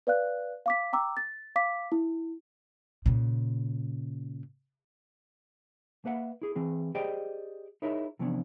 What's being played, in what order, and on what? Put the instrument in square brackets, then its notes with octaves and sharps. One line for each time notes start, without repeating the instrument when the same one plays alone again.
[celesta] B4 D5 F5 F#6
F5 D6 B6
G5 A#5 D6 E6
A6
F5 D6 B6
E4
[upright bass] A#2 C#3
[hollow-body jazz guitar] A#3 B4 E5 F#5
E4 G#4
E3 C4 G#4
G4 G#4 C5 D5 D#5 G5
D#4 E4 G#4 A#4 C#5 E5
C3 E3 F3 B3 C#4 D4